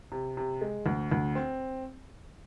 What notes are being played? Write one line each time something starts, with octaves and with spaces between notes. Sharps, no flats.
C3
C3
G#3
D2
D2
C4